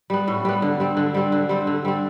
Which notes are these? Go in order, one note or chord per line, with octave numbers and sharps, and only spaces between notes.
G3 B3
A2
G3 B3
D3
G3 C4
D3
G3 C4
D3
G3 C4
D3
G3 C4